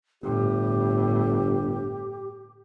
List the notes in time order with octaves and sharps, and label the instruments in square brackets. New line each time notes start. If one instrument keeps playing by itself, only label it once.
[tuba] G1 [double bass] A2 [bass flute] G4